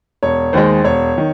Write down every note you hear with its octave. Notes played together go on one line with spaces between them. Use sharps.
E1 C#5
D#2 D#3 G#3 C5
E1 C#5
D#3